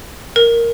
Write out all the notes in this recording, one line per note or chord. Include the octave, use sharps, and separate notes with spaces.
A#4